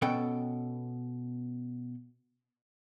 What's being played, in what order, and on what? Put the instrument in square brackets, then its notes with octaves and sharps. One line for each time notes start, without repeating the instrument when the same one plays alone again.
[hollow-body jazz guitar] B2 B3 C#4 A4 G5